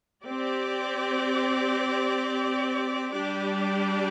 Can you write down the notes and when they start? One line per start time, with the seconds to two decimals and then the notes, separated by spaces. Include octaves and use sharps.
0.23 C4 G4 D5
3.12 G3 D4 G4 D5